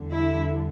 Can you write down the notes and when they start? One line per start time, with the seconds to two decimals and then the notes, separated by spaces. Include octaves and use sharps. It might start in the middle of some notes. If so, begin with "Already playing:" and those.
Already playing: E2 D3 G3
0.11 E4